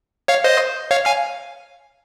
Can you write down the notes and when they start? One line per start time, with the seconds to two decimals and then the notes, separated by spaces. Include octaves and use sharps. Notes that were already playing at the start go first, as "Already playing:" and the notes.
0.28 C#5 F5
0.44 C5 D#5
0.91 C#5 F5
1.06 F5 G#5